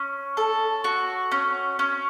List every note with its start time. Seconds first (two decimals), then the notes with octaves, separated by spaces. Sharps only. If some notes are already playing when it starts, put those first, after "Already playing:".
Already playing: C#4
0.37 A4
0.84 F#4
1.32 C#4
1.79 C#4